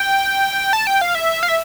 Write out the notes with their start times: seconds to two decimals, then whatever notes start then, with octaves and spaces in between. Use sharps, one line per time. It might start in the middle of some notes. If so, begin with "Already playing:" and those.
Already playing: G5
0.73 A5
0.87 G5
1.01 F5
1.15 E5
1.43 F5
1.48 E5